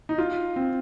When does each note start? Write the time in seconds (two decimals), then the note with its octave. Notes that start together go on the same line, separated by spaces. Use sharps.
0.09 D#4
0.18 F4
0.56 C4